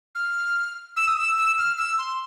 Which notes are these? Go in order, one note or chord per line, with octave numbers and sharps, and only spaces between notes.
F6
E6
D#6
E6
E6
F6
E6
C6